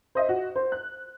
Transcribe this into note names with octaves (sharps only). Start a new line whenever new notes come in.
C5 D#5 E5
F#4
C5
F#6